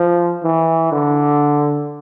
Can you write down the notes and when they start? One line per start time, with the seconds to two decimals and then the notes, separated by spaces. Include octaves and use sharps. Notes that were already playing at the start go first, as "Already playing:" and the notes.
Already playing: F3
0.43 E3
0.92 D3